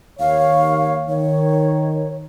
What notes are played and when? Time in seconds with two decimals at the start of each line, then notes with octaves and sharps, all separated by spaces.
0.20 D#2 C#5 F5
1.09 D#3 C#5